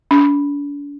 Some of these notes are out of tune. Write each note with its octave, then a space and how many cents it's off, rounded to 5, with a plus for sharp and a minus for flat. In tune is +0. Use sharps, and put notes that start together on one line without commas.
D4 -40